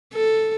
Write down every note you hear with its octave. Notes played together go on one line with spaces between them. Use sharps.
A4